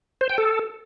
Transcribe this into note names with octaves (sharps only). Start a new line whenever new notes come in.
C5
G5
A4